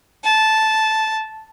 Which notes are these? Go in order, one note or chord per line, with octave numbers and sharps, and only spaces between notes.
A5